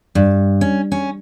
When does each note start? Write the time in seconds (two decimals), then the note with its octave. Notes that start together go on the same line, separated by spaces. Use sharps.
0.15 G2
0.61 C#4
0.92 C#4